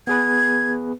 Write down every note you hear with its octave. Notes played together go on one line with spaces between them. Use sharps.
B3 G#4 B4 G#6